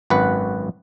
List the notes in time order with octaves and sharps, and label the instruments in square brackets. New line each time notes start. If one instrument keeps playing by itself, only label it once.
[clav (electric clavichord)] G#1 F#2 B4 F#5